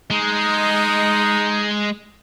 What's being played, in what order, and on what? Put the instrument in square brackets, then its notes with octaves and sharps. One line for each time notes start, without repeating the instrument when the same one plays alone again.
[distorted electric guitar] G#3 [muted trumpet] D#4